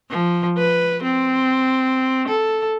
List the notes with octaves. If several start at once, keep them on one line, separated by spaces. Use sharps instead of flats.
F3
B4
C4
A4